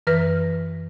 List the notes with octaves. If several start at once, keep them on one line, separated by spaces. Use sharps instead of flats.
F#2 E3 B4 F6 A#6